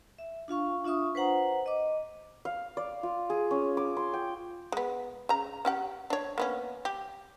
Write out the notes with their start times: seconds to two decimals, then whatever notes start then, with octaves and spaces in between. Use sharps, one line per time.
0.19 E5
0.48 D4 F4 F5 C#6
0.84 D4 F4 E5 C#6 D#6
1.15 B4 C5 F#5 A#5
1.66 D#5 D6
2.45 F5
2.77 D5
3.03 F4
3.30 G#4
3.51 C#4
3.77 D6
3.97 C6
4.14 G5
4.72 G#3 B3
5.29 C#3 A#5
5.65 C#4 G4 F#5
6.10 D4 C#5
6.38 A#3 B3 C#4
6.85 G4